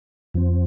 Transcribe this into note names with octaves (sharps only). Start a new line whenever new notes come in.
F2 F3 C4